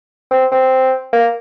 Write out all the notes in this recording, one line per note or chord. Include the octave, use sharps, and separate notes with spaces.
C4
C4
A#3